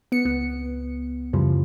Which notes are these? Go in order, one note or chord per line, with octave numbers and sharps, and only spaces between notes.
B3 C#7
C#2 B3
F#2 C#3 E3 F3 G3